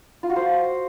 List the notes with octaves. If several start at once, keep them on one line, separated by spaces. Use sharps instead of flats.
F4
F#4
C5